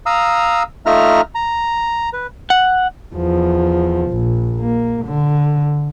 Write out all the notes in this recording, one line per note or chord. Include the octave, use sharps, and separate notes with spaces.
F5 A#5 D#6 E6
A3 D#4 F4 E5 A#5 F6
A#5
B4
F#5
E2 F3
A#1
A#3
D3